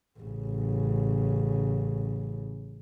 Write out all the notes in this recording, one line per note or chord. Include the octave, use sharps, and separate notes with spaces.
A1 C#3